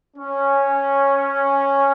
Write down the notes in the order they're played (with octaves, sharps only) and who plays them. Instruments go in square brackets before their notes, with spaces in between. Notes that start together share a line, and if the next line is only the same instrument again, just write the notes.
[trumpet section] C#4